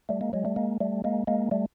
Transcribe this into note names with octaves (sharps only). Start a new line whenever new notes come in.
G3 A3
G#3 A#3
F#3 G#3
G3 A3
G#3 A#3
G3 A3
G#3 A#3
G#3 A#3
G3 A3